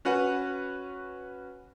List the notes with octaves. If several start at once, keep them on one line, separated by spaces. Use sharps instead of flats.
C#4 F#4 B4 F#5